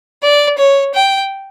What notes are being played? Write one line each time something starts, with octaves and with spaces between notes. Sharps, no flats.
D5
C#5
G5